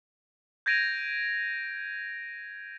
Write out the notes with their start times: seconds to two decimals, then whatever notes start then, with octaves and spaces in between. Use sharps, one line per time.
0.66 G6 G#6 A#6 D7 D#7 F7